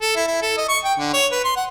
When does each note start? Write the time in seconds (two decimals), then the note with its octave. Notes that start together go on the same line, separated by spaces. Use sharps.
0.01 A4
0.16 E4
0.27 E4
0.42 A4
0.57 D#5
0.69 C#6
0.85 G5
0.99 D3
1.13 C#5
1.32 B4
1.44 C6
1.57 F#5